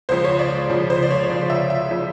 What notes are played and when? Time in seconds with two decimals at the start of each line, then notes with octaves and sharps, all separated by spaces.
0.09 C#2 C#3 F3 C5
0.25 C#5
0.39 D5
0.70 C#2 C#3 F3
0.90 C5
1.03 D5
1.11 C#5
1.30 C#2 C#3 F3 D5
1.50 E5
1.70 E5
1.91 C#3 F3